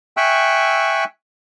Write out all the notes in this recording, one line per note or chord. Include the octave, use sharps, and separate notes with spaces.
E5 G5 G#5 C#6 E6 F#6